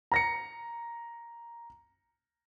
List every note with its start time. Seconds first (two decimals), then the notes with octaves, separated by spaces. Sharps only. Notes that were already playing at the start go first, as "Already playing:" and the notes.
0.12 A#5 A#6 C#7